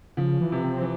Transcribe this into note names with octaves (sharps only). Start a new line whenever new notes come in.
C#3 F3
E3
C3
C4
E3